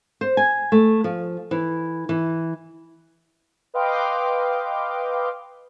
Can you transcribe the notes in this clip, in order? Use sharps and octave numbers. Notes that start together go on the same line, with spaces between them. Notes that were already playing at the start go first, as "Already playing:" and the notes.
C5
G#5
A3
F3
E3
E3
B4 D#5 F5 G5 C6 D6